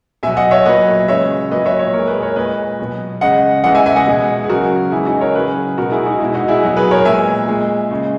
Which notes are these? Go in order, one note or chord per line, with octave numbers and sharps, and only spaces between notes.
B2 F#3 E5 G#5
D#5 F#5
C#5 E5
A#2 F#3 B4 D#5
C#3 G#3 C#5 E5
A#2 F#3 B4 D#5
C#5 E5
C#5 E5
A#2 G#3 A#4 C#5
G#4 B4
A#4 C#5
A#2 G#3 B4 D#5
B2 F#3
C#3 G#3 D#5 F#5
C#3 E3 G#3 D#5 F#5
E5 G#5
E5 G#5
D#5 F#5
B2 G#3
G#4
C#3 F#3 F#4 A#4
C#3 E3 G#3 E4 G#4
D#4 F#4
A#4 C#5
C#3 F#3 G#4 B4
B2 G#3 F#4 A#4
E4 G#4
D#4 F#4
B2 G#3 E4
D#4 F#4
E4 G#4
B2 F#3
G#4 B4
A#4 C#5
A#2 G#3 E5 G#5
A#2 G#3
C#3 G#3